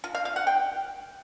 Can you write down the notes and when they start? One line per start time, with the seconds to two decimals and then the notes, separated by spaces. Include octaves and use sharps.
0.04 F4
0.14 F5
0.25 F5
0.36 F#5
0.47 G5